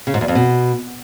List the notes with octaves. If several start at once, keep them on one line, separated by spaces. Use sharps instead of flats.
C#3
G#2
E2
F2
B2